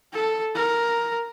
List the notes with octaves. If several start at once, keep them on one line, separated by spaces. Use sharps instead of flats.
A4
A#4